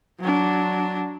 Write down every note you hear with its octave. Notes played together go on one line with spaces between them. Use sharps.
F#3 D4